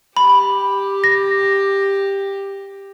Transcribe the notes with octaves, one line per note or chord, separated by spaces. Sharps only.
G4 B5
A#6